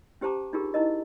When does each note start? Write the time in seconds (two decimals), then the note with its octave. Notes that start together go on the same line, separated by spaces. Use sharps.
0.21 C#4 G4 C5 A5 A#5 D6
0.53 D4 D#4 F4 G4 G#4 A#4
0.74 D#4 E4 A#4 D#5